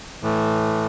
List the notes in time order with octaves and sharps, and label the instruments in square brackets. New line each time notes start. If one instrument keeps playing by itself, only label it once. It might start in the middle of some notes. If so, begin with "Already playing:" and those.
[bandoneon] A2 E3 A3